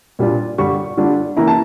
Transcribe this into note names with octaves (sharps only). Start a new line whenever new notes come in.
A#2 G3 D4 F4
G2 D3 G3 C#6
D3 G3 D4 F4
E3 A#3 C#4 E4 A#5
A5